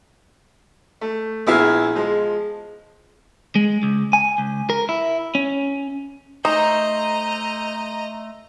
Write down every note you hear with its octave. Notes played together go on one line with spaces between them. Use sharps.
A3
A#1 B3 E4 G#4 E5 F6
F3 G#3
G#3
C#2
G#5
C#2
A#4
E4
C#4
A3 D#4 C5 D#5 A#5